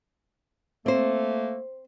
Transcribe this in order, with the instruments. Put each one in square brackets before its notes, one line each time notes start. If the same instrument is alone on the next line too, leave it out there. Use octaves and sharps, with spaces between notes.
[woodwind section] A3 A#3 [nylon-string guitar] C4 C5